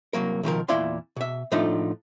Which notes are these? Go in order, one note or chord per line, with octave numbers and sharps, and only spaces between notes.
C2 F#3 A#3 A#4
B2 D#3 F3 A#4
E2 A#2 E4 D5 F5 C6
B2 E5
A2 F3 A3 D4 D#4 F4